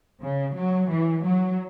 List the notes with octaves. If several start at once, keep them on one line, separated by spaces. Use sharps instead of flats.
C#3
F#3
E3
F#3